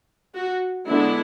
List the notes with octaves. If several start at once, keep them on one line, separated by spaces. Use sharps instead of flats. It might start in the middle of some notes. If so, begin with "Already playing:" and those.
F#4
D3 G#3 B3 D4 E4